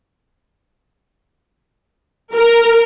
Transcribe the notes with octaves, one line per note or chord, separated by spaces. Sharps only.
A#4